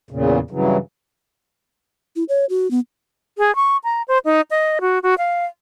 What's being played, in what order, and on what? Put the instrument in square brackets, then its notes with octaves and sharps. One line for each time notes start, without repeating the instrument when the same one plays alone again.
[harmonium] E2 A#2 C#3
G2 C#3 E3 F#3
[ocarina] E4
C#5
F#4
B3
[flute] G#4
C#6
A#5
C5
D#4
D#5
F#4
F#4
F5